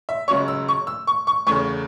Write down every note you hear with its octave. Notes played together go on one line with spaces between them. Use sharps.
E5
C#2 C#3 F#3 C#4 C#6
E6
C#6
E6
C#6
C#6
E2 C#3 A3 C#4 C#6